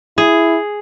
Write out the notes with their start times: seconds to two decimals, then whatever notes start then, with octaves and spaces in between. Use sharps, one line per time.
0.18 E4 G#4